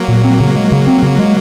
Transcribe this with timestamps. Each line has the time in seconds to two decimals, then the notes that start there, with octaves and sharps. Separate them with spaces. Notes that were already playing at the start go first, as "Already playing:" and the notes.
Already playing: F#3 A#3
0.08 A#2
0.24 C4
0.40 C#3
0.56 G#3
0.72 C#3
0.87 C4
1.03 C#3
1.19 G#3